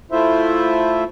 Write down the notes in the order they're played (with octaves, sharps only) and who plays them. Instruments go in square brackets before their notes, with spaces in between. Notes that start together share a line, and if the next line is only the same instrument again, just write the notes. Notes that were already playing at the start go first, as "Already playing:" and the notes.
[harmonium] A3 E4 F4 C5 E5